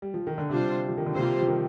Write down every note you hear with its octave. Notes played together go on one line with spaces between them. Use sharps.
G3
F3
D#3
D3
C3 G3 D4 F4 C5
F3
D#3
D3
C3 G3 A#3 F4 C5
F3
D#3